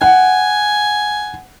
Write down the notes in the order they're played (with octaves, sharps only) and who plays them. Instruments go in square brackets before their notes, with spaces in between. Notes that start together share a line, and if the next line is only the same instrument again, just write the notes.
[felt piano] F#5 [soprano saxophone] G#5